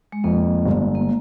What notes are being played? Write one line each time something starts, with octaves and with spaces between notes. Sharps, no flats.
G#3
F2 A#3
G1
A#3